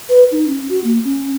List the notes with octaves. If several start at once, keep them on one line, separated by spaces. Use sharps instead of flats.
B4
D#4
C#4
F#4
A#3
C#4